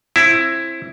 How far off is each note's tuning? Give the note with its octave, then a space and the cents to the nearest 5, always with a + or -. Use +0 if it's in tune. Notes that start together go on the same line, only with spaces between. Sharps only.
C4 +25 E4 +10